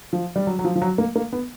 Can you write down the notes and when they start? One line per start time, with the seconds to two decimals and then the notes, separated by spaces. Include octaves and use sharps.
0.13 F3
0.36 G3
0.47 F#3
0.59 F#3
0.64 F3
0.75 F3
0.82 F#3
0.98 A#3
1.16 A#3
1.33 B3